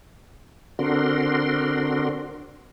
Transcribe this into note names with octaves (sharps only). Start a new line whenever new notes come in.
D3 C4 D4 F#4 A#4 C6